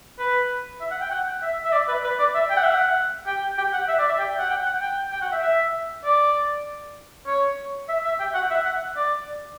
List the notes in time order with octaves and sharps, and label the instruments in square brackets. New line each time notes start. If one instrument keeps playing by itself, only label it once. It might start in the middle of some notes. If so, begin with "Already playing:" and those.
[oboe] B4
E5
F#5
G5
F#5
E5
E5
D5
B4
B4
D5
E5
G5
F#5
E5
F#5
G5
G5
F#5
E5
D5
E5
G5
F#5
G5
F#5
G5
G5
F#5
E5
E5
D5
C#5
E5
E5
G5
F#5
E5
F#5
D5